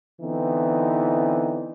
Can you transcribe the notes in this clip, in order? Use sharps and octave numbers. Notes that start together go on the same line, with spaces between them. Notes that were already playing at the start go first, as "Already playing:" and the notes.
D3 E3 B3 C4 D#4